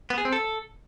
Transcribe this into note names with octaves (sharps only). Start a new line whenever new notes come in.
B3
G#4
C4
A4